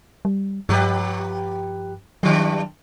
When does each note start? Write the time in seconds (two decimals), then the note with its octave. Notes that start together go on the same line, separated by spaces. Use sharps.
0.25 G3
0.69 G2 F3 G4 B4
2.23 G2 D#3 F#3 G3